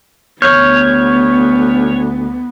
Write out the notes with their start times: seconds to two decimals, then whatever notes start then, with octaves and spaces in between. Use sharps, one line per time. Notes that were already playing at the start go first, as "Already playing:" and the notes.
0.42 D2 B3 C#5 F6 G6